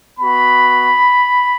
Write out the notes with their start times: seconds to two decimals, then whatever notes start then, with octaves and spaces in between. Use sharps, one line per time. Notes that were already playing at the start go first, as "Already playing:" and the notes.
0.19 B3 F#4 B5